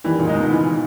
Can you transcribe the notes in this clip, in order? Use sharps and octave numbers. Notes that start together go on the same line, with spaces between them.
D#3 E3 G3
A#2 C#3
G#3 D#4
G#2 B2
E3